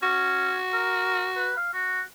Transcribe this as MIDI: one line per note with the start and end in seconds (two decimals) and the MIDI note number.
0.03 0.54 61
0.03 1.51 66
0.73 1.28 70
1.37 1.56 71
1.57 1.72 77
1.73 2.02 66